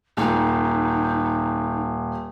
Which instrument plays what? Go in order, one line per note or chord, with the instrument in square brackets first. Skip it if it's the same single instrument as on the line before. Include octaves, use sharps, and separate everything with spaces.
[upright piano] D#1 [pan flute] D#4